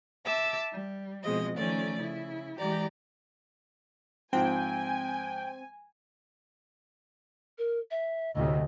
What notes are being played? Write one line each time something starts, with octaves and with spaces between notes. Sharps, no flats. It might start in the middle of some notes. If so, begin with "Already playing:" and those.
E5 A5 D6 E6
G3
B2 F3 G#3 C4 D#5
D#3 F3 A3 C#4 D5
C#3 E4
E3 G#3 G4 D5 A#5
G#2 F3 C4 G5 G#5
A#4
E5
D2 A2 C3 D#5